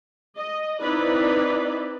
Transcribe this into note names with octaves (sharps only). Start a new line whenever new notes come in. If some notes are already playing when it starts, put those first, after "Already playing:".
D#5
C4 D#4 E4 B4 D5